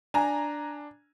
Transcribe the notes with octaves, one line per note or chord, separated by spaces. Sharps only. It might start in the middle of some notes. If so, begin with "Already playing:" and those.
D4 G#5 A#5